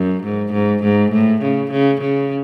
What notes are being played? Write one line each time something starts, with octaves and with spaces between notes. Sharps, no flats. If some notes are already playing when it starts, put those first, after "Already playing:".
Already playing: F#2
G#2
G#2
G#2
A2
C#3
C#3
C#3